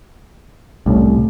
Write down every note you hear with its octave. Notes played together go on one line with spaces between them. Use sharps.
C2 A2 A3 C#4